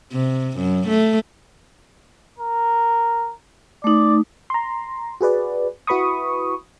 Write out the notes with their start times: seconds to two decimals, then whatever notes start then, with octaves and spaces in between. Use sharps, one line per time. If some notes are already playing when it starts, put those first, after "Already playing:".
0.13 C3
0.57 F#2
0.88 A3
2.39 A#4
3.84 A3 D#4 D5
4.50 A#5 C6
5.21 F#4 G#4 B4 D5
5.87 E4 F#4 B4 B5 C#6 D#6